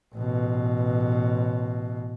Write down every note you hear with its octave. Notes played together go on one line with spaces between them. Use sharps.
A1 B2